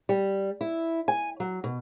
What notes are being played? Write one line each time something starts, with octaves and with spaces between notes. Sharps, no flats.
G3
E4
G#5
F#3
B2